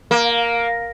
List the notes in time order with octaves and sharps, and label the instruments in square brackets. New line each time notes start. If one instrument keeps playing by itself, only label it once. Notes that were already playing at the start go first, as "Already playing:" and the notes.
[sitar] A#3